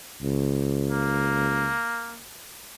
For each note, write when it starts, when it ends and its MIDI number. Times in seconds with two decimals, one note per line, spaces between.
0.22 1.74 37
0.90 2.20 58